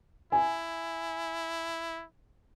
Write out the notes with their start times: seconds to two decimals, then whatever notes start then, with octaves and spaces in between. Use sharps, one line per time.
0.32 E4 G#5